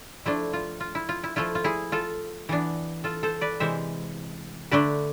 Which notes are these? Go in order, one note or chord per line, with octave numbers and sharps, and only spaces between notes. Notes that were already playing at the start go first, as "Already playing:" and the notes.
F3 A3 D4 E4
F4
F4
E4
F4
E4
F3 A3 E4 F4
F4
E4 G#4
F4 A4
E3 B3 D4
F4 A4
A4 C5
B4 D5
C3 E3 G#3 C5 E5
D3 A3 D4 B4 D5